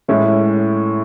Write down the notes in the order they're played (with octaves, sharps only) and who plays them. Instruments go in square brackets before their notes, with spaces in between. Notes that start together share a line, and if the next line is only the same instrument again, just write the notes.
[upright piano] A2 E3 G#3 C#4 E4